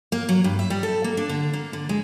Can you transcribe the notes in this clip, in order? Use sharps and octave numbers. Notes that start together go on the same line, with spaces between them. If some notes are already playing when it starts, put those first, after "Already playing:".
A#3
F#3
G2
E5
G3
A4
A#3
D4
D3
A#3
D3
G#3